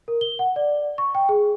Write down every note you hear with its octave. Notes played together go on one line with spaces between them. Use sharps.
A#4
G7
F#5
D5
C#6
G5
G#4